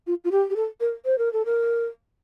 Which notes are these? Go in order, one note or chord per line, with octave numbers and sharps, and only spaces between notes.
F4
F4
G4
G4
A4
A#4
C5
A#4
A4
A#4